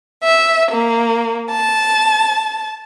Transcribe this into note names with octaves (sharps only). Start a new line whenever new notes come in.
E5
A#3
A5